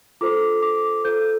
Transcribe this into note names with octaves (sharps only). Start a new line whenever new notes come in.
F4 A4 C5 D6
D6
F4 A4 C5 G6